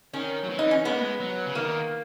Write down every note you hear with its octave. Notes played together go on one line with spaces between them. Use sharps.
D#3 C#4
F#3
E3
D#4
C#4
G#3 B3
A#3
G#3
F#3
C#3
D#3 A#3